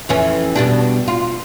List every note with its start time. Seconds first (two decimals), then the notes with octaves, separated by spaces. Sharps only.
0.09 F2 E3 C#4
0.56 B2 G3 D4
1.08 F4